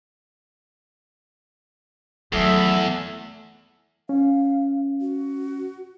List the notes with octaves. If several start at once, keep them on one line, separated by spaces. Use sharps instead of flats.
E2 D#3 F#3 A3 A4 E5
C#4 F5
F#4